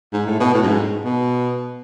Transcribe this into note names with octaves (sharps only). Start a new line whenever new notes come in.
G#2
A2
B2
A2
F#2
G#2
B2